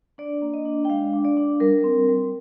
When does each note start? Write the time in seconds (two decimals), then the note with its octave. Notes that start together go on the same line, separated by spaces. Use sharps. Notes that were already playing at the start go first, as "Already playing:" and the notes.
0.18 D4 D5
0.42 A#3
0.54 D#5
0.65 D4
0.85 G5
0.89 G#3 F5
1.13 D4
1.25 D5
1.37 D4
1.60 G3 A#4
1.84 C4
2.09 G3